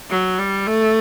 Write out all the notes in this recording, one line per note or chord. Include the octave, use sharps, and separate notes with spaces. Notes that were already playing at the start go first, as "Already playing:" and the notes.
F#3
G3
A3